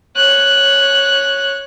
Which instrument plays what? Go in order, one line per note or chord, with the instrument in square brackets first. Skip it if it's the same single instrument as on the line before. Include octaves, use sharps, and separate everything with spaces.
[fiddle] C#5 F#6